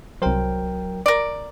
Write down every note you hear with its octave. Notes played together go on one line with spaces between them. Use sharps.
C2 F#3 A#4 C5 G5
A#4 D5